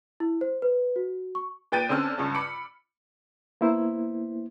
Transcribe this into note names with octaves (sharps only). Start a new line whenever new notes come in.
E4
C5
B4
F#4
C#6
A#2 B4 G5 A6 D7 D#7
D3 C4 C#4 E6 F6
C#2 G2 C#4 A5
B5 D6 C#7
A#3 B3 E4 C5